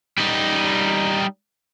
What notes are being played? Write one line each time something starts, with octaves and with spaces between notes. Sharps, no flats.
G3 D#4